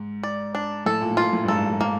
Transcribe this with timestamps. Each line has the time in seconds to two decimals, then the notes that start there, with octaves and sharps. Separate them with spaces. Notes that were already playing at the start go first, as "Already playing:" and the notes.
Already playing: G#2
0.23 D5
0.55 D4
0.86 A2 A4
1.01 A#2
1.11 A2
1.17 A#2 F4
1.28 A#2
1.33 A2
1.44 G2
1.48 G#2 A4
1.70 G#2
1.81 A#3